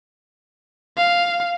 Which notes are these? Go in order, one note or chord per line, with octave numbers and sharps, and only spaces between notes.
F5